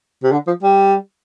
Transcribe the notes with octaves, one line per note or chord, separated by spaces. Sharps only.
C3
D3
F3
G3